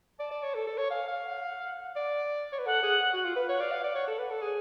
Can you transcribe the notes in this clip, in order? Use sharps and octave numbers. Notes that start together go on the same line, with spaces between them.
D5 A5
D5
C#5
A4
A4
C#5
F5 G#5
F5
F#5
D5
C#5
B4
A4 F#5
G#4
F#4
F4
B4 F5
C#5 F#5
D5 F5
F5 F#5
D5
C#5
A4
B4
A4
G#4